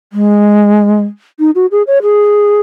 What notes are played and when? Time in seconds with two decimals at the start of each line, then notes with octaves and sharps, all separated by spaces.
0.13 G#3
1.39 D#4
1.55 F#4
1.71 G#4
1.87 C#5
2.03 G#4